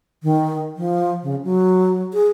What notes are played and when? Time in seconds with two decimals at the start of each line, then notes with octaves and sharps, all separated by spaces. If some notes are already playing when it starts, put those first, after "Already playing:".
0.23 D#3
0.76 F3
1.23 C#3
1.44 F#3
2.14 G#4